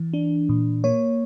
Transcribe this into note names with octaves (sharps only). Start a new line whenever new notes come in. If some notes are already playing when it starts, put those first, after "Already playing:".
Already playing: E3
D4
A#2
A#3 C#5